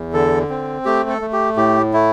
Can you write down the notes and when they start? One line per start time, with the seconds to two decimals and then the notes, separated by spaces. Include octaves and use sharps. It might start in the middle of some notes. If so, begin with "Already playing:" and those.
Already playing: E2
0.13 D3 A4
0.50 C4
0.85 A3 G4
1.10 A4
1.21 A3
1.33 G4
1.57 A2 G4
1.93 A3 E4